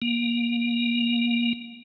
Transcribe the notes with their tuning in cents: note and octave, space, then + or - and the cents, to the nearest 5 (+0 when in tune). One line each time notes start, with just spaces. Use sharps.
A#3 +25